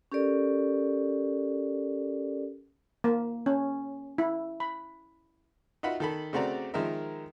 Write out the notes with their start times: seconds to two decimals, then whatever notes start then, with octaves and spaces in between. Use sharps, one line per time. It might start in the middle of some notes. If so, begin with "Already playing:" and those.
0.12 C#4 G4 A4 A#4 D5
3.04 A#3
3.46 C#4
4.18 E4
4.60 B5
5.83 D#4 F4 F#4 E5 F#5 B5
6.00 D#3 A4 B5
6.33 C#3 A3 C4 F#4 D5 A#5
6.74 D#3 F3 G#3 A#4 E5